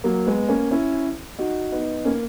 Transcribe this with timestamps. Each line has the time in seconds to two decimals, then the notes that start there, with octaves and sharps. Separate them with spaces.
0.04 F#3 A#3
0.26 G#3 B3
0.49 A#3 C#4
0.71 C#4 E4
1.39 D#4 F#4
1.72 B3 D#4
2.05 A#3 C#4